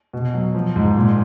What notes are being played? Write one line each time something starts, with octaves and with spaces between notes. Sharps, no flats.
B2
F#3
F3
G#2
A#2